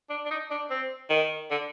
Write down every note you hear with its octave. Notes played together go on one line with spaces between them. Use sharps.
D4
D4
D#4
D4
C4
D#3
D3